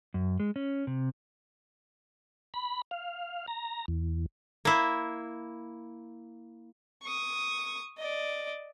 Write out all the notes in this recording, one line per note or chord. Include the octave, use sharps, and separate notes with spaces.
F#2
G#3
C#4
C3
B5
F5
A#5
E2
A#3 E4
C#6 D#6
D5 D#5